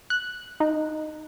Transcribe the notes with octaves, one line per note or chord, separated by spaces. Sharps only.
F#6
D#4